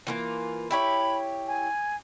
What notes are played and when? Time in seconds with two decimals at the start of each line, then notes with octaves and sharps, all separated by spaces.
0.07 E3 A#3 F4
0.71 E4 G4 C#5 B5
1.48 G#5